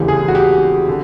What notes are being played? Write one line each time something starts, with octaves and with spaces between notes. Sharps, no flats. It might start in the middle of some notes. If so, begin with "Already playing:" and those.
Already playing: E1 D2 C#3 E3 G4
G#4
F#4
G4
D3